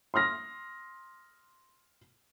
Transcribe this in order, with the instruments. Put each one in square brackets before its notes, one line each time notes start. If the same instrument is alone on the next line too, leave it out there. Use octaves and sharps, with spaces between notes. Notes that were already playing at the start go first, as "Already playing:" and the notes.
[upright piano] C6 D#6 F6 A#6